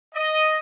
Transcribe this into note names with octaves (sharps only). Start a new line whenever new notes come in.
D#5